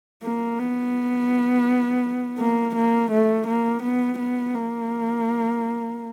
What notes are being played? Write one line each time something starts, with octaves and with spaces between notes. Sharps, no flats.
A#3
B3
A#3
A#3
A3
A#3
B3
B3
A#3